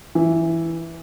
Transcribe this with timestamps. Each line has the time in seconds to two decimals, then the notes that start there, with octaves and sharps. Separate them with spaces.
0.15 E3